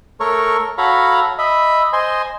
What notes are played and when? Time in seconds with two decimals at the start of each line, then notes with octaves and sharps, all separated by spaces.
0.20 A3 A4 A#4 C#5 C#6
0.78 F#4 A4 C#5 F5 A#5 B5
1.38 D#5 E5 B5
1.93 C5 D#5 G#5 C6